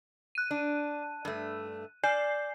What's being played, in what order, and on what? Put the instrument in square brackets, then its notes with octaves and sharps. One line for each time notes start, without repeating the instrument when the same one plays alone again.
[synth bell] F#6 D#7
[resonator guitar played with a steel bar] D4
G2 A3
[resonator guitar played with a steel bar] D5 [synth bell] G#5 G6 C7